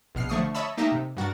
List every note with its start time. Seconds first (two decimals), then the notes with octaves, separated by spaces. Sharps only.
0.15 A#1 B2 F6 C7
0.29 D3 F3 A3 C#6 D#6 C7
0.55 C#5 D#5 E5 A5 B5 E6
0.77 A3 A#3 D#4 G4 D#5 E5
0.92 C3
1.17 G2 F#4 A#4 A6